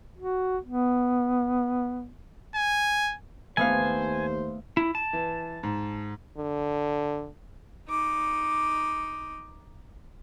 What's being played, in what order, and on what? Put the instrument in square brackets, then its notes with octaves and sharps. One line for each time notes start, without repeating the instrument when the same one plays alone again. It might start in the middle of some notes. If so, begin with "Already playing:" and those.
[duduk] F#4
B3
[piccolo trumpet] G#5
[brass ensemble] D#2 C5 [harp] A3 B3 F5 [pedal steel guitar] G#5
[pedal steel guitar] E4
A5
[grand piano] E3
G#2
[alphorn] D3
[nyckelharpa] D#4 D6